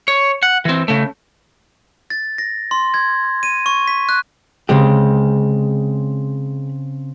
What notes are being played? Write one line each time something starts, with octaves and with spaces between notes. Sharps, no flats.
C#5
F#5
E3 C4
C#3 A3
A6
A#6
C6
G#6
D#7
C#6
B6
F#6
C#3 G#3 C4 G4